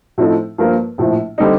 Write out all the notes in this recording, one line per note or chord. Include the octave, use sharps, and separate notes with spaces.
A2 F3 C4 D#4 A4
G2 F3 A#3 F4 A#4
A#1 A2 F3
D3 G3 C4 D#4